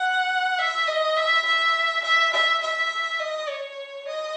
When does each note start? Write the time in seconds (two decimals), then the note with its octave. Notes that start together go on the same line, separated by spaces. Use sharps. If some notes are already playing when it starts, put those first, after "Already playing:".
Already playing: F#5
0.58 E5
0.87 D#5
1.16 E5
1.45 E5
2.04 E5
2.33 E5
2.61 E5
3.19 D#5
3.48 C#5
4.07 D#5